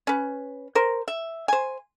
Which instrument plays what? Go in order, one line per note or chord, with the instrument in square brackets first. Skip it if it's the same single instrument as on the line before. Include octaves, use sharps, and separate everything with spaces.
[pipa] C#4 B4
A#4 C5
E5
C5 G#5